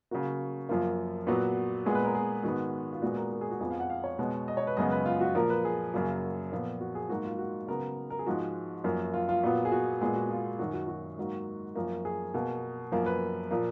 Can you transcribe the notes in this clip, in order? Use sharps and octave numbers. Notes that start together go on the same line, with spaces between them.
C#3 F#3 A#3 F#4
F#2 F3 A#3 F4
A#2 F#3 B3 F#4
A#2 G#3 B3 G#4
B4
A#4
G#4
G#2 D#3 G#3 B3 F#4
F4
A#2 G#3 B3 F#4
A#4
A#4
G#4
F#4
F2 F3 B3 G#4
F5
F#5
F5
C#5
B2 G#3 B3
D#5
C#5
B4
F#2 C#3 G#3 B3 D#5
B4
F4
F#4
A#2 F3 A#3 A#4
B4
G#4
F#2 C#3 F#3 A#3
A#2 F3 B3
F#4
G#4
G#2 F#3 A#3 F#4
F4
F#4
C#3 F#3 B3 A#4
A#4
G#4
G#2 F3 G#3 F#4
F#2 F3 A#3
F4
F4
A#2 F#3 B3
G#4
F#4
A#2 G#3 B3 G#4
F#4
F4
F#2 D#3 F#3 F#4
F#4
F#4
G#2 F#3 A#3
F#2 F3 A#3
G#4
B2 A#3
F#2 F3 A#3
B4
A#2 F3 A#3